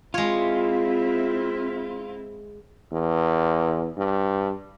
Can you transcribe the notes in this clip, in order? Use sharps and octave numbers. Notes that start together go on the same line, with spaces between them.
G#3 C4 E4 F4 C#5
E2
G2